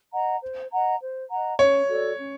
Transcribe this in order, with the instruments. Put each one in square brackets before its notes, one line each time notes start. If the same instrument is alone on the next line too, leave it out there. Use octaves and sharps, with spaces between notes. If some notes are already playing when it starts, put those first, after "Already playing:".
[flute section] D#5 F#5 A#5
C5
D#5 F#5 A#5
C5
D#5 F#5 A#5
[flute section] C#4 [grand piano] C#5
[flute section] F#4 A4 D5
C#4